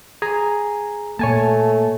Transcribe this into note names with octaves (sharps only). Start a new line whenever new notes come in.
G#4 G#5 A#5
A#2 A3 A#3 C#5 G#5 A5